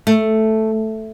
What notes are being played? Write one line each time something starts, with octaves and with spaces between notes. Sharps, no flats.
A3